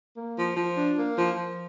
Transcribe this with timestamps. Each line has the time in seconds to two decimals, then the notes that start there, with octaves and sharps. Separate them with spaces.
0.17 A#3
0.37 F3
0.57 F3
0.77 D4
0.97 A#3
1.17 F3
1.36 F3